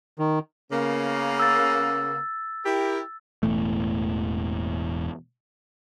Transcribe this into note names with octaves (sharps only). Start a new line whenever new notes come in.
D#3
C#3 A#3 B3
E6 A6
E4 G4 A#4
E1 E2 A2 A3